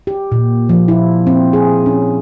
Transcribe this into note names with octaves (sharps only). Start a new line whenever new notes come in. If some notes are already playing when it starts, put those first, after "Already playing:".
G4
A#2
F3
E4
C4
G#4
C#4